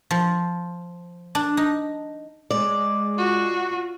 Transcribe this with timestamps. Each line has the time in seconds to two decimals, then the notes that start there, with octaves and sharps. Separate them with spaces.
0.11 F3
1.35 D4
1.57 D#4
2.50 G#3 D5
3.18 F4 F#4